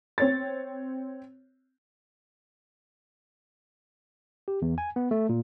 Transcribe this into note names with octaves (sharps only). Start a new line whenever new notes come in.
C4 C#5 A6
G4
E2
G#5
B3
A3
A#2